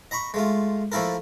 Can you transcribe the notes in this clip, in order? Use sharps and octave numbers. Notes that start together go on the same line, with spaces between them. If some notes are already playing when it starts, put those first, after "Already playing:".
D#5 A#5 B5 C#6
G#3 A3 F4
F3 A3 A#3 E4 A4 A#4